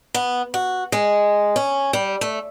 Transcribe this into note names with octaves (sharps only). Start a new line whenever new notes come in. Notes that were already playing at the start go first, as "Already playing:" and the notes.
B3
F#4
G#3
C#4
G3
A3